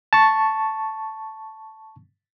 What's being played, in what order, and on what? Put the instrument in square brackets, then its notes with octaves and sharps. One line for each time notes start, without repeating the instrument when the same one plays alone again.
[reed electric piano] A5 C#6